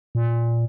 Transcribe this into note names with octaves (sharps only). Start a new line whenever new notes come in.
A#2